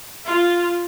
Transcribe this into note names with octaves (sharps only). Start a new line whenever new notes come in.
F4